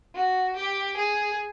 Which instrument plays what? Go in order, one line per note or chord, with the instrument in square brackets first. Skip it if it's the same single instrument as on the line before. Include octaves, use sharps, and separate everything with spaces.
[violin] F#4
G4
G#4